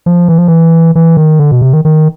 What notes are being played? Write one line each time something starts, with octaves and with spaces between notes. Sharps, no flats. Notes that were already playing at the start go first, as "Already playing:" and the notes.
F3
E3
F3
E3
E3
D#3
D3
B2
C3
D#3
D#3